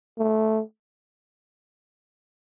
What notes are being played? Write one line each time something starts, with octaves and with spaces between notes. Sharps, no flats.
A3